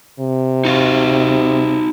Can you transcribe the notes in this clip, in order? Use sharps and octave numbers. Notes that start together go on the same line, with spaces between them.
C3
D#4 F#4 F5